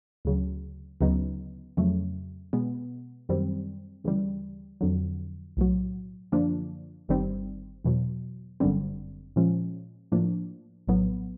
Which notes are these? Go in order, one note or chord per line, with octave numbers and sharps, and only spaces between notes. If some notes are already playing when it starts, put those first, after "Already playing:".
D2 C#3 F#3
D2 C#3 F#3 B3 D#4
F2 C#3 F#3 A3
B2 G#3 B3
F#2 D#3 G3 C4
D2 C#3 E3 G3
F2 D3 F#3
B1 A2 F#3
F#2 D3 F3 A#3 D4
G1 G2 D#3 G3 C4
E2 B2 F#3
G1 F#2 D3 G3 C4
A#2 F3 G#3 C#4
A2 F3 A#3 D4
A#1 A2 F#3 B3